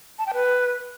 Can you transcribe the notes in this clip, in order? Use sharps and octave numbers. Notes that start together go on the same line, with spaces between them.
A5
G5
B4